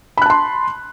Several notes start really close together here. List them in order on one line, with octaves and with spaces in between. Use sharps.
B5 F#6 A5 C6